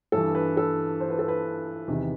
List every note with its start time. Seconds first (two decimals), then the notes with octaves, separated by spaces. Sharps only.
0.12 G2 E3 A4
0.35 B4
0.57 A4
1.00 C5
1.10 B4
1.19 A4
1.28 B4
1.88 E2 C3 D#3